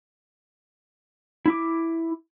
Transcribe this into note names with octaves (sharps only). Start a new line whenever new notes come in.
E4 D6